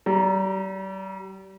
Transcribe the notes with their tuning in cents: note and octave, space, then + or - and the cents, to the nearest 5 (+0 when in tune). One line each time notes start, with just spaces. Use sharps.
G3 -35 A#5 +0